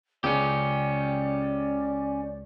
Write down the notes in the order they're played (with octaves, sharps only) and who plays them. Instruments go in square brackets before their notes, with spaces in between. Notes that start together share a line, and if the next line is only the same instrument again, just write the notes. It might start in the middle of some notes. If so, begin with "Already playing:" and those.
[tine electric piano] C#2 [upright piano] C#3 [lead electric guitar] C#4 G4 [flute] D5